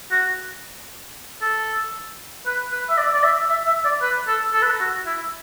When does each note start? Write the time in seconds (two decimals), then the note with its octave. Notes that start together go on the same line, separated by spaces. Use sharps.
0.11 F#4
1.42 A4
2.46 B4
2.71 B4
2.89 E5
2.97 D5
3.14 D5
3.23 E5
3.49 E5
3.66 E5
3.85 D5
4.02 B4
4.27 A4
4.53 A4
4.62 B4
4.70 A4
4.80 F#4
5.06 E4